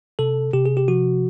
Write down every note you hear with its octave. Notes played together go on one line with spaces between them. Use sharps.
C3 A4
C3 G4
G#4
G4
F3 F#4